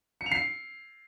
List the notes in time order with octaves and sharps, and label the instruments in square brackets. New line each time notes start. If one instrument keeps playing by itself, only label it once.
[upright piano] C#7
F7
C7